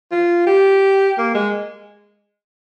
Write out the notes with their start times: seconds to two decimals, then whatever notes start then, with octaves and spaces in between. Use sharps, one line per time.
0.12 F4
0.47 G4
1.18 A#3
1.35 G#3